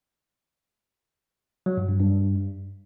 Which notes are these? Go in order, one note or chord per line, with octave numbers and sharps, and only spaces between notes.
F#3
G2
G2
G2